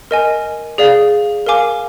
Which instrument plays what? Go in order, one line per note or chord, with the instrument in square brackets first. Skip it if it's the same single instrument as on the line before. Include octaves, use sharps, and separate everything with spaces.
[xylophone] A#4 D#5 G#5
G#4 D5 F5
A#4 F5 G#5 D6